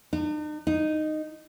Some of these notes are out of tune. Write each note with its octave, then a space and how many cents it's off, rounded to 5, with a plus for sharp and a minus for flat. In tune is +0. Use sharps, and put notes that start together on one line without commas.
D#4 -45
D#4 -10